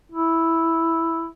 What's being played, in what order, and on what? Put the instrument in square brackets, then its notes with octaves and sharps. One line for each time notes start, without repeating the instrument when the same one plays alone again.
[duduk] E4